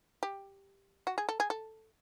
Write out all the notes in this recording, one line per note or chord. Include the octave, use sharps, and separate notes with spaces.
G4
F#4
G#4
A4
G#4
A4